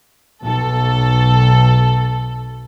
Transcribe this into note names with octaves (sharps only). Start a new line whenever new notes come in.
B1 A4